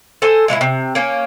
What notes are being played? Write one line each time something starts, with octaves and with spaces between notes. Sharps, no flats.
A4 C5 G#5
A#2 G#3 C4 E4
C3
A#3 C#4